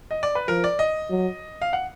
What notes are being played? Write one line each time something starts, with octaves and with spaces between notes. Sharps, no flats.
D#5
D5
B4
F3 A#4
D5
D#5
F#3
F5
F#5